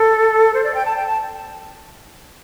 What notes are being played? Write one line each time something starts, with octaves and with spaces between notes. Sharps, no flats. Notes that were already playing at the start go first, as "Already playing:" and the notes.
Already playing: A4
C5
D5
G5
A5
G5
A5